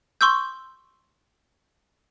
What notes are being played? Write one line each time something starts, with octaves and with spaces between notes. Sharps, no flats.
C6 C#6 E6 G6